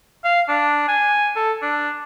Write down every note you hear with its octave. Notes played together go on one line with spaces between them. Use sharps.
F5
D4
G#5
A4
D4